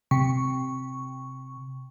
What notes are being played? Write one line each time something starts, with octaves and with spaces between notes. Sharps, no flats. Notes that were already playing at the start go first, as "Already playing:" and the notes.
C3 C#6